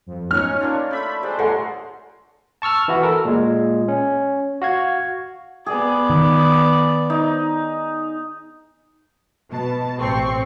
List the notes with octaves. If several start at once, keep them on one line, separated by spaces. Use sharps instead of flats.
F2
C#4 D#4 C#5 F6
A#3 D4 F4
A3 E5 B5
G3 G#3 D4 C5
A4 A#4 C#5 F#5 G#5 C6
A5 C#6 E6 F6
E3 E4 F#4
A4 A#4
A#2 G#3
C#4
F#4 F5 G#6
B3 G#4 D5
D#3
D#4
B2 A5
A1 C4 C#6 C7